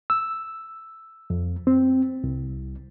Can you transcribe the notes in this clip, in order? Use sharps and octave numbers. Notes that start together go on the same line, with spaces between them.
E6
F2
C4
C2